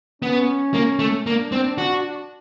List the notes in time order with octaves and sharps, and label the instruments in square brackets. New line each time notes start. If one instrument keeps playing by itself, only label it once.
[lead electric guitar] B3 [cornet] C#4
[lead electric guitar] A#3
A3
[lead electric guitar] A#3 [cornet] D4
[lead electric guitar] C4
F#4